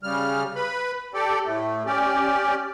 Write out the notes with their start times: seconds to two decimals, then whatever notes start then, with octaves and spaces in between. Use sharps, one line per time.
0.03 C#3 G3 F6
0.55 B4 B5
1.14 G4 A4 D5
1.46 A2 A3
1.86 C#4 G4 D5